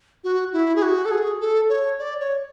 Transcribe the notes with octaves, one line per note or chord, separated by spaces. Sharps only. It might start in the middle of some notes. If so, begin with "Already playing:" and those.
F#4
E4
G#4
F#4
A4
G#4
A4
C#5
D5
C#5